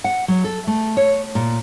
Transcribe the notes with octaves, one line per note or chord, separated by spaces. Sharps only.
F#5
F#3
A4
A3
C#5
A#2